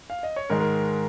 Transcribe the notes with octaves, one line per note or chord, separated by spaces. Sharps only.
F5
D#5
C#5
G#2 D#3 G#3 A#4
A#4